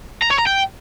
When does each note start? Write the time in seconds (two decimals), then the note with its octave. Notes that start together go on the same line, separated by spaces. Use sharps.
0.22 A#5
0.30 C#5
0.38 A#5
0.47 G5